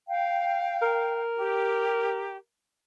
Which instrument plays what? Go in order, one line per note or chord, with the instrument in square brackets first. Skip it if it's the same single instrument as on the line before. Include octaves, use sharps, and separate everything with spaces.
[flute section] F5 G5
[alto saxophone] A#4
[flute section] G4